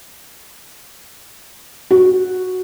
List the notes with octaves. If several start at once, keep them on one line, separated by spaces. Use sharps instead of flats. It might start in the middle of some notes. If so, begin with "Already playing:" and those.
F#4